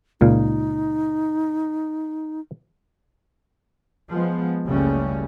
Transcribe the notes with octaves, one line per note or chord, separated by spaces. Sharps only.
C#2 A#2 D#4 F5
F3 G#3 B3
F#1 C#2 C#3 G3 A3 C#4